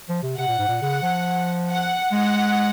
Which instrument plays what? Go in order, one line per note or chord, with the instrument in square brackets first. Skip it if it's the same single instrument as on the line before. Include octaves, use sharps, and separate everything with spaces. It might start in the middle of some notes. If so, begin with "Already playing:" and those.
[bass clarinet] F3
C3
[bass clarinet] C3 [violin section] F#5
[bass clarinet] A#2
G#2
A#2
[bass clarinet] C#3 [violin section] F#5
[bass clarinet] F3
[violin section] F#5
[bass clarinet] G#3 [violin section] F#5